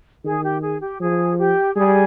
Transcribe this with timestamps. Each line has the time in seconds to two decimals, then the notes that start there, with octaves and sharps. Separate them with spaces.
0.24 D#3 G#4
0.43 G4
0.61 G#4
0.80 G4
1.00 F3 G#4
1.38 G4
1.75 G3 G#4